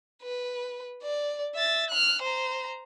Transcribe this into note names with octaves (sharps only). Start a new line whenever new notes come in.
B4
D5
E5 A6
F6 F#6
C5 A#5